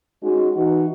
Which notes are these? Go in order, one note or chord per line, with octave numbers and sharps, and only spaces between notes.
G#3 C#4 D#4 F#4
E3 D#4 F#4